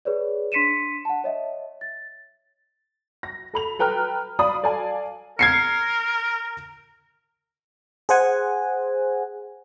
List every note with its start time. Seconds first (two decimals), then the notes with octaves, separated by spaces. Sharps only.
0.05 G#4 B4 C#5 D5
0.52 D4 C6 B6 C#7 D#7 E7
1.05 F#5 A5
1.24 C#5 D#5 E5
1.81 A6
3.23 A#6
3.54 A4 B5 F7
3.79 A4 B4 G5 A#5 F6
4.39 D5 F5 B5 D#6
4.63 A4 D5 F5 G#5 A5
5.39 A#4 G#6 C7 C#7
8.09 G#4 C5 F#5 G#5